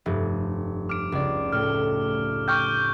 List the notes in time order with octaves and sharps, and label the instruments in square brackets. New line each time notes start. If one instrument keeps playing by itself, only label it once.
[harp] F1 G2
[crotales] D6 D7 [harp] F6
[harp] C#2 D5
[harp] A2 [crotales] F6
[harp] G5 D6 [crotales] C#6 F6 G6